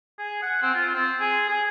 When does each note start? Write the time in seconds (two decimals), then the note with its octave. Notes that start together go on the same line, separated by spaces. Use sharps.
0.19 G#4
0.42 F#5
0.63 C4
0.75 F4
0.94 C4
1.20 G#4
1.49 G#4